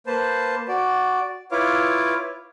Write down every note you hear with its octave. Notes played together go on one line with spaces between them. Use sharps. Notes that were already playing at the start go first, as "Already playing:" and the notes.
A#3 B4 C5 A5
F#4 D5
E4 F4 B4 C#5 F5 D6